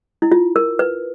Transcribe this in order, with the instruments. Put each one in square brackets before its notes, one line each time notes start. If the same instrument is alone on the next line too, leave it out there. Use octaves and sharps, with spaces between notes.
[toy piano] E4
F4
A#4
B4